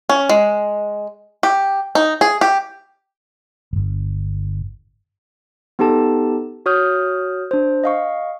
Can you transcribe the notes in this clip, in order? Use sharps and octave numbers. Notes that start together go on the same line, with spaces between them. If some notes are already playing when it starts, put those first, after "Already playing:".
C#4
G#3
G4
D#4
G#4
G4
D1 G1
B3 D#4 G4 A4 A5
F#4 C#5 D#6 F6 G6
D4 C5
D#5 F5 C#6